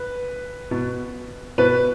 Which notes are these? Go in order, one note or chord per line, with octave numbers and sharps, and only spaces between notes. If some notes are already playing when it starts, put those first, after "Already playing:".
Already playing: B4
B2
B2 B4